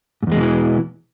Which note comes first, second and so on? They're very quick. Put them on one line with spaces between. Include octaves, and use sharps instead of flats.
G#2 E2 G#3 B2 E3